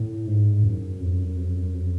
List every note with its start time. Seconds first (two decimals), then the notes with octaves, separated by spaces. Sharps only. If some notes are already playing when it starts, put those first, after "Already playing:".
Already playing: A2
0.27 G#2
0.64 F#2
1.00 F2
1.19 F#2
1.37 F2
1.56 F#2
1.74 F2